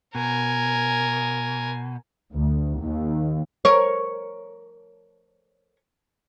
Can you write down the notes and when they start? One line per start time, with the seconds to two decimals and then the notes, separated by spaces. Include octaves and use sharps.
0.15 B2 A#4 G#5
2.34 D2
2.80 D#2
3.65 A#4 C#5